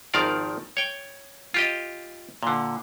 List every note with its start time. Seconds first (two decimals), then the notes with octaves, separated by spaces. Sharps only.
0.14 G#1 D#3 F3 A#4 D5 F5
0.77 C#5 G5
1.54 F4 G4 D#5
2.43 A#2 D3